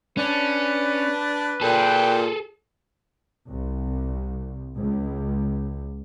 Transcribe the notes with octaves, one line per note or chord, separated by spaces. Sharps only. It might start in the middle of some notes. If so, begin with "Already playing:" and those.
C#4 D4 B4
A#2 G#4 A4 G5
C2
C#2